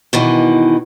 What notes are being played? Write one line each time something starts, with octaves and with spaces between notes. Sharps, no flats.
B2 D#3 E3